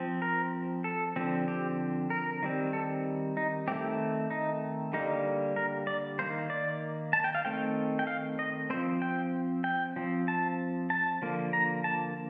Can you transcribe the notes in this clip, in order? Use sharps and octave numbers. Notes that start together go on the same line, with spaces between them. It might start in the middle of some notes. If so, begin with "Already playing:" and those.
Already playing: F3 C4
A#4
A4
D3 F3 C4
G4
A#4
D#3 G3 C4
A4
D#4
D#3 A3 C4 G4
D#4
D3 G3 A#3 D#4
A#4
D5
D#3 A#3 C5
D5
A5
G5
F5
D#3 A3 C4 G5
G5
F5
D#5
F3 C4 C5
G5
G5
F3 C4
A5
A5
D3 F3 A#3
A#5
A5